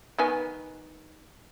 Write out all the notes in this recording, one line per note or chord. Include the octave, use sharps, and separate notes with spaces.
D#3 B3 G#5